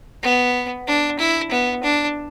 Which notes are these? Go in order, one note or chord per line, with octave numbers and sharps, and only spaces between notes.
B3
D4
E4
B3
D4